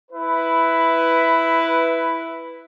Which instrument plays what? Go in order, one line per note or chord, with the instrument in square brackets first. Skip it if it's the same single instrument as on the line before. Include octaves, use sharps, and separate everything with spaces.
[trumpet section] E4 B4